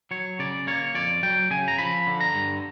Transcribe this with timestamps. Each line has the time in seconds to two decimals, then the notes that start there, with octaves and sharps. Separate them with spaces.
0.11 F#3 C#5
0.39 C#3 D5
0.67 A#3 C#5
0.95 F2 D5
1.23 F#3 G5
1.50 C#3 G#5
1.68 A#5
1.78 F3 B5
2.07 D3
2.21 A#5
2.35 G2